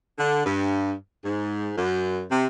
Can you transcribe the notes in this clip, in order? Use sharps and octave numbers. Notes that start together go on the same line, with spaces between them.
D3
G2
G#2
F#2
C3